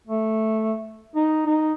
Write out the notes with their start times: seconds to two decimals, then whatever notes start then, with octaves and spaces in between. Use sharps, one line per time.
0.07 A3
1.15 D#4
1.46 D#4